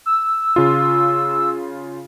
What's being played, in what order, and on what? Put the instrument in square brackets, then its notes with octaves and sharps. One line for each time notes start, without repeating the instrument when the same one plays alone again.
[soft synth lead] E6
[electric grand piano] C#3 F4